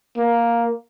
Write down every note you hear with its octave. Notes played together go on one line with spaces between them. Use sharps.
A#3